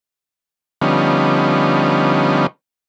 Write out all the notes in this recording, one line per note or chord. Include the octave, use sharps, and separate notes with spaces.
D3 F3 G3 B3 C#4 D#4